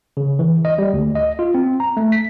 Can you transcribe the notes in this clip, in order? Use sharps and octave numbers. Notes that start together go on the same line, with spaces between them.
C#3
E3
D#5
G3
D2
D#5
F4
C4
A#5
A3
B6